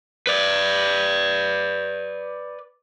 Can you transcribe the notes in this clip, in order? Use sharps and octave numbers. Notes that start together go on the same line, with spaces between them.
B4 D5